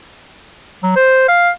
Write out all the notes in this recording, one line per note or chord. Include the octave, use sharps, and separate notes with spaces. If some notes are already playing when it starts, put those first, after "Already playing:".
F#3
C5
F5